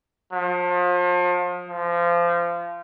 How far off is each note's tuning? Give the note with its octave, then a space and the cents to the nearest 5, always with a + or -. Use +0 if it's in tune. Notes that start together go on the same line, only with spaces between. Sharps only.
F3 +35
F3 -25